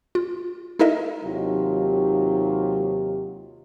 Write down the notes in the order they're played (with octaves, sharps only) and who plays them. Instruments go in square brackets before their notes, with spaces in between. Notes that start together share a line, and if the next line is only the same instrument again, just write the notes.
[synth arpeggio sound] F4
D#4 E4 A4 A#4 D#5 E5
[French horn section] D#2 C3 F#3 D#4 F4 G4